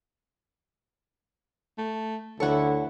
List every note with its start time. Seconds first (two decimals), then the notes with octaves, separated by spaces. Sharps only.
1.78 A3
2.40 D2 D3 E4 A4 C#5 F#5 C#6